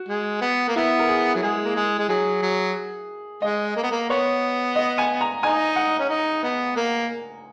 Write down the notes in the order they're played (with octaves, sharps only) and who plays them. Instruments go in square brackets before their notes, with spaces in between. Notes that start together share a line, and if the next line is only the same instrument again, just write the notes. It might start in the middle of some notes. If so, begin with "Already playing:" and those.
Already playing: [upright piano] F#4
[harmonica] G#3
B3
A#3
[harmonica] B3 [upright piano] E4
[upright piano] A#4
G#4
[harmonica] F#3
[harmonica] G#3 [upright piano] G#4
[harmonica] A#3
G#3
G#3
[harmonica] F#3 [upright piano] G#4
[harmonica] F#3
[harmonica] G#3 [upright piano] D#5
[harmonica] A#3
B3
A#3
[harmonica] B3 [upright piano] C#5
[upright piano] D#5
G#5
A#5
[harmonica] D#4 [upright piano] G#5
[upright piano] F#5
[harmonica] C#4
D#4
B3
A#3